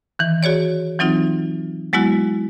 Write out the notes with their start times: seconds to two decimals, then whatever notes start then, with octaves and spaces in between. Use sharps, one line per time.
0.19 D#3 E3
0.43 F#4 G#4 C#5 D5
0.99 E3 F#3 C4 D#4 F4
1.93 F#3 G#3 B3 E4 F#4